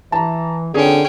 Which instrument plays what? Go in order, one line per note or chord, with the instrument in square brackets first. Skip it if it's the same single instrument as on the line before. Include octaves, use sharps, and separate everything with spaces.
[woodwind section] E3 [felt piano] A5 A#5
[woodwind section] G2 A#2 C4 [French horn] D3 [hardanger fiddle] C#4 G5 [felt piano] G#4